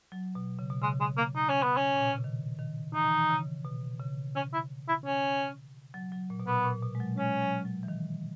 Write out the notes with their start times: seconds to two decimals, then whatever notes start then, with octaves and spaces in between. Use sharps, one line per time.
0.12 F#3
0.35 B2
0.59 C#3
0.70 B2
0.82 C#3 G#3
1.00 G#3
1.18 A#3
1.36 D#4
1.49 C#4
1.63 B3
1.77 C#4
1.95 A#2
2.05 B2
2.14 C#3
2.24 D#3
2.59 D#3
2.94 E3 D#4
3.04 D#3
3.13 E3
3.30 C#3
3.65 B2
4.00 C#3
4.36 C#4
4.53 E4
4.88 E4
5.06 C#4
5.94 F#3
6.12 F#3
6.30 A#2
6.40 B2
6.47 A#2 B3
6.65 A#2
6.83 B2
6.95 G#3
7.00 F#3
7.18 G#3 C#4
7.41 F#3
7.65 F#3
7.83 E3
7.88 D#3